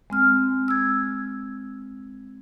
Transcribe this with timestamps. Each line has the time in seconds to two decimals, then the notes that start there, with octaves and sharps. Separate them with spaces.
0.10 G#3 C4 F6
0.68 E6 G#6